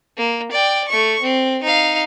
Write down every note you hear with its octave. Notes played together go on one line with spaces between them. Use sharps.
A#3
D5 G5
A3 C#6
C4
D#4 F5